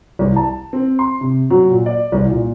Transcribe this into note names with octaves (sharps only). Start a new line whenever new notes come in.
C2
A5
C4
C6
C3
F#3
A#2
D5
C2
A#2